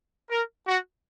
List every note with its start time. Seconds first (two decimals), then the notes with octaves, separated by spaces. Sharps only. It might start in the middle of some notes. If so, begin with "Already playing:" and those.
0.30 A#4
0.67 F#4